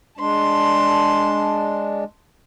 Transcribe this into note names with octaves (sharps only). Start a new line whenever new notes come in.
G#3 D4 A5 C6